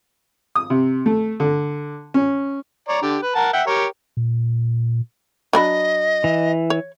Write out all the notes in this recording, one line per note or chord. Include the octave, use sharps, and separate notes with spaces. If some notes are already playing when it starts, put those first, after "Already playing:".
D#6
C3
A3
D3
C#4
C#5 D5 A#5
D3 G4
B4
A#4 F#5 A5
E5 F#5 G5
G4 A#4 C#5
A#2
F#3 D4 D#5 B5
E3
C#5